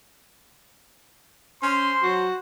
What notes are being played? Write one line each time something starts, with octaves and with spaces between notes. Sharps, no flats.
C#4 C5 C6
F#3 F#4